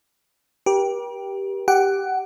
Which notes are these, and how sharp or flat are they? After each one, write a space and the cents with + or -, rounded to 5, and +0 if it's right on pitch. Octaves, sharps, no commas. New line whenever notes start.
G4 +0 A#4 +45
G4 +0 F#5 +15